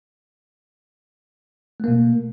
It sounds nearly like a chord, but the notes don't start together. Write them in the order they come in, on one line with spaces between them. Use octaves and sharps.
A3 A#3 B2